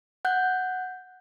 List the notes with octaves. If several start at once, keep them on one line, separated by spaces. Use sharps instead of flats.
F#5 F#6 G6